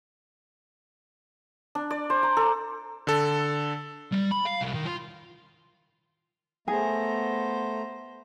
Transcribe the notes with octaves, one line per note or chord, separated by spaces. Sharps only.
D4
D5
C5
A#5
A4
D3 A4
G3
B5
F5
C2
D#3
F4
A3 B3 G#4 C5 A#5